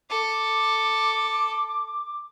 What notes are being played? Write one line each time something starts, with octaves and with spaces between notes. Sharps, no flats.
A4 D6